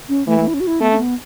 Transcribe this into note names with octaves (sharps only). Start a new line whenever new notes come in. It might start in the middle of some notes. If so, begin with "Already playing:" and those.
C#4
E3 A3
A3
E4
C#4
F#4
E4
A3 B3
C#4
B3